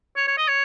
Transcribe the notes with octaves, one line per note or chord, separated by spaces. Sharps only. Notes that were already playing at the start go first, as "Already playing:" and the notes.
C#5
C#5
D#5
C#5